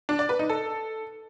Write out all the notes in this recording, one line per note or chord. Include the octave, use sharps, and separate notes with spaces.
D4
D5
B4
D#4
A4